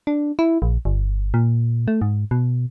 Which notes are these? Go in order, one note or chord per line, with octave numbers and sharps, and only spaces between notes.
D4
E4
A#1
G1
A#2
A3
G#2
B2